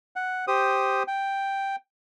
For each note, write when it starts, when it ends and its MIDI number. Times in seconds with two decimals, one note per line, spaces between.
0.16 0.45 78
0.48 1.03 67
0.48 1.03 72
0.48 1.03 87
1.08 1.76 79